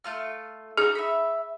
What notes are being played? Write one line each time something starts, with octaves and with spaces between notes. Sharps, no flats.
A3 F4 F6
D#4 F#4 G#4
E5 B5